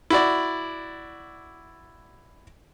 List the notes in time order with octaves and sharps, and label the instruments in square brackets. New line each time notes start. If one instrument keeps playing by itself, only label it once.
[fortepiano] E4 F#4 D5